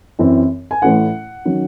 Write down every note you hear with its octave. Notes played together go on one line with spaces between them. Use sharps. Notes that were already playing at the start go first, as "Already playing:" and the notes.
F#2 E3 C4
G#5
A1 A2 E3 A3 C#4 F#5
D#3 F#3 C#4